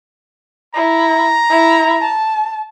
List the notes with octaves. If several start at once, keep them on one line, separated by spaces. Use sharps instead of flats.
E4 A#5
E4
A5